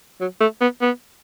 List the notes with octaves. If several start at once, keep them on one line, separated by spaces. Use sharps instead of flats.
F#3
A3
B3
B3